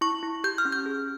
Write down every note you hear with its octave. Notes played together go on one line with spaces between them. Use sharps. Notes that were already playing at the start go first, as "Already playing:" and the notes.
E4 C#6
E4
G4 G6
F6
C#4
G6
G#4